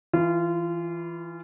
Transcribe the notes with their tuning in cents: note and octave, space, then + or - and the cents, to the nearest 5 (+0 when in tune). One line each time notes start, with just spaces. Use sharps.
E3 +0 F4 -25